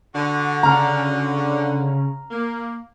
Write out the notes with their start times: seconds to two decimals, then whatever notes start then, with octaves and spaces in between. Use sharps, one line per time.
0.15 D3 F#4
0.63 C#3 C#4 A#5 F6
2.31 A#3